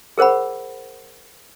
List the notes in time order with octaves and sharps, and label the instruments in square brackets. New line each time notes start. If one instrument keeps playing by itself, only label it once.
[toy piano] G#4 A#4 C5 F#5 B5